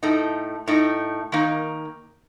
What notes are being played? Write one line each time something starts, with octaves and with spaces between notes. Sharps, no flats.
A2 A3 D#4
A2 A3 D#4
D#3 A#3 D#4